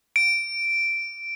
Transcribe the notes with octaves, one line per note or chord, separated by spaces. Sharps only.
D7